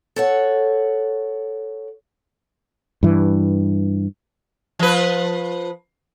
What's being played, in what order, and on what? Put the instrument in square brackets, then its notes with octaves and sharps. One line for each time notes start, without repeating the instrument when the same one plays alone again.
[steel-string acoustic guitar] A4 C#5 F#5
[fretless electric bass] G2 E3
[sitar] F3 B4